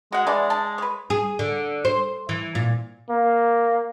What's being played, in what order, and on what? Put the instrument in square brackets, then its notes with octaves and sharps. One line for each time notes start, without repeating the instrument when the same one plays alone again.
[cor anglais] G#3 [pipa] F#4 F#5
[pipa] E3 D4 D5 [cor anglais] G#3
[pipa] A5
B4 C#5
[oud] G#4
D3
C5
E3
A#2
[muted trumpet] A#3